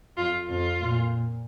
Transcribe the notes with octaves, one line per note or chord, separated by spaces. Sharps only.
F2 F4
F2 F4
A#2